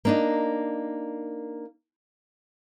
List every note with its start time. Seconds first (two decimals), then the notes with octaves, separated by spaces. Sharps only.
0.05 A#3 D4 D#4